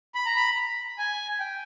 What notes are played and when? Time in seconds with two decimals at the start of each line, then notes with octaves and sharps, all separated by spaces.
0.15 B5
0.26 A#5
0.36 B5
0.98 G#5
1.40 G5